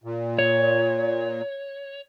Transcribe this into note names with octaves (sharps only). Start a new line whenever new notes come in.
A#2
C#5